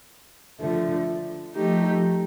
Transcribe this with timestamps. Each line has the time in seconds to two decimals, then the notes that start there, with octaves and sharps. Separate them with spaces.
0.60 D3 F3 A3
1.54 F3 A3 D#4 G4